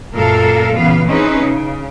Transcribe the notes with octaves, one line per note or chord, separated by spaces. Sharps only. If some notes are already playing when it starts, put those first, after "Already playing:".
F#2 A#2 A4 A#4 F5
A#2 C#3 E3 B3 B4 F5
C4 C#4 D#4 E4 G#4 B4
C#3